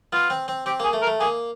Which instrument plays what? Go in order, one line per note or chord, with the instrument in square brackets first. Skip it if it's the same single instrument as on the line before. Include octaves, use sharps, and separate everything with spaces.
[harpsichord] B3 [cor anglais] F4
[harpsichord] C4
C4
[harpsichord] C4 [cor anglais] G4
[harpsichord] A#3 [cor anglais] G#4
[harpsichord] A3
[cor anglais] A#4
[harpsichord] A3
[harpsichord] A#3 [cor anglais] G#4